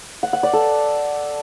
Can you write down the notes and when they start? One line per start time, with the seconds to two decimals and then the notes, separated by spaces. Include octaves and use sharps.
0.23 F#5
0.33 F#5
0.43 D5
0.53 A4